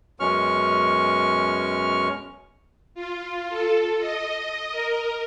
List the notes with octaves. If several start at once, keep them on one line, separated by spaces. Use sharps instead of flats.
F#2 B2 G#3 C#4 C#6 F6
F4
A4
D#5
A#4